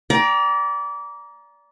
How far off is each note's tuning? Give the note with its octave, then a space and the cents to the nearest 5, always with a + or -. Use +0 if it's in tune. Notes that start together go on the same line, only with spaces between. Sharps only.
D5 -25 G5 +0 A#5 +20